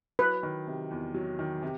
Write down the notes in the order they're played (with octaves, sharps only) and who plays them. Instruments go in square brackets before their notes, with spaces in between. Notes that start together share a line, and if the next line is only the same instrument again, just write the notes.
[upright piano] F#3 [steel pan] B4
[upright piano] D#3
C3
E2
F#3
D#3
C3